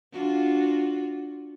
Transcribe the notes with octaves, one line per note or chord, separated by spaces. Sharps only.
D4 F4 F#4